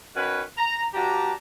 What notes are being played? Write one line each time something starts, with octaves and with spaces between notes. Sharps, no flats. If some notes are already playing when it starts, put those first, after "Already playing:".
D#3 C#4 F#4 B4
A#5
G2 D4 F#4 G4 A5 A#5